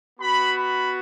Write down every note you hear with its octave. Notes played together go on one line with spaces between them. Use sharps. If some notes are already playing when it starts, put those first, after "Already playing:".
B3 F#4 B5
B5